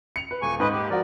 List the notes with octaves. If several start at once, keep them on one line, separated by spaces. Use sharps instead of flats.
C#7 F7
B4
D#1 G#5 C#6
G#2 B4 D#5
D#2 G4
F3 F#4 A#4 D5